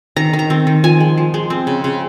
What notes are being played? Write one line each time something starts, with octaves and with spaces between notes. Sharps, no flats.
D#3 A#5
D#3
A#5
C4
D#3
F3 G#5
G#3
F3
G#3
C4
C#3
C#3